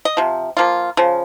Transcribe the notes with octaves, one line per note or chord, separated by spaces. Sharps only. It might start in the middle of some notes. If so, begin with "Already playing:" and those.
D#5
C3 F3
F3 A#3 F4
C#3 F3